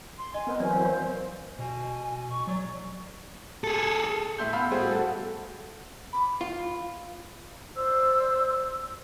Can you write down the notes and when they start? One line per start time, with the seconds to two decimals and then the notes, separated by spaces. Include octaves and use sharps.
0.18 C6
0.34 D#5 G#5
0.47 B3 C4 A#4
0.60 E3 F#3 C4 D5 G#5
0.73 A#4 C5 F5
1.59 B2 G#5
2.29 C#6
2.47 F#3 D5
3.64 G#4 A4
4.38 A2 E5 C6 G6
4.53 B3 F5 B5 E6 G6
4.71 A2 G3 F#4 G#4 C5
4.91 F#4 A4
6.13 B5 D6
6.41 F4
7.76 C5 D5 E6